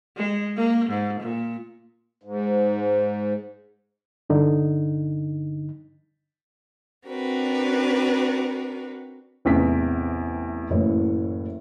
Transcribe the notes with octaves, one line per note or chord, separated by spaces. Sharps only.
G#3
A#3
G#2
A#2
G#2
G2 D3 D#4
C4 D4 F#4 A#4 B4
A1 E2 C3 B6
F#1 A2 E3 C#5